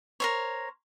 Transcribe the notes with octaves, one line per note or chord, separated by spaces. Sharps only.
A#4 C5 C#5